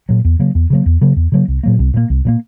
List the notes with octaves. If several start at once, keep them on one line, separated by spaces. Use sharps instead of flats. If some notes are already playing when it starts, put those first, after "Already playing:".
A#2 F#3
E2
C#3 F#3 A#3
E2
C#3 F#3 A#3
E2
C#3 F#3 A#3
E2
C#3 F#3 A#3
C2
A#2 F#3 A#3
C2
A#2 F#3 A#3
C2
A#2 F#3 A#3